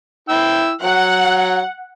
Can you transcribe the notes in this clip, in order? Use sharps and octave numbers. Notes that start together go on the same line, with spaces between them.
E4 G5 E6
F#3 F#5